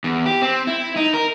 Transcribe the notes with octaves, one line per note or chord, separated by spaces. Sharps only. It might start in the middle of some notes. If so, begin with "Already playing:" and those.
E2
G4
C4
E4
D#4
A#4